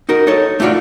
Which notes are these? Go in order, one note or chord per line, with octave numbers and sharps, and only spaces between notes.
D#4 F#4 A#4
D#4 A4 C#5
A3 D4 F4 F#4 D5